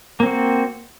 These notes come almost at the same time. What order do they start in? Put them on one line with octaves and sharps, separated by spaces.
A#3 C4 F#4